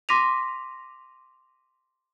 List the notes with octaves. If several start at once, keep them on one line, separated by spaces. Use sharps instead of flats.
C6 D6 A#6 B6 D#7 F7